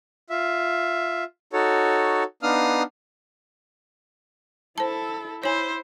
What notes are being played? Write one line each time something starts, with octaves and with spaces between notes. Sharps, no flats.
F4 E5
D#4 F#4 A4 C#5
B3 D4 D#4 F5 D#6 F6
E4 A4 C5 A5
E4 C5 C#5 G#5